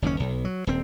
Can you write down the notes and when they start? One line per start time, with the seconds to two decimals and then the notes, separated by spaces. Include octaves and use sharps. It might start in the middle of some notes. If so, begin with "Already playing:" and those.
0.02 F#1 D#2 C#3 C#4
0.20 B1
0.45 F#3
0.67 D#1 C4